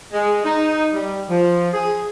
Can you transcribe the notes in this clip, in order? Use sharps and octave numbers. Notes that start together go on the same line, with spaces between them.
G#3
D#4
G3
F3
G#4